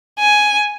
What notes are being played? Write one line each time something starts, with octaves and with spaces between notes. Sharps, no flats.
G#5